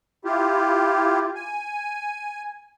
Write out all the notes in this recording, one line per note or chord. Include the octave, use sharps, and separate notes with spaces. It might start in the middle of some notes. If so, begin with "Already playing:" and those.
E4 F4 G4
G#5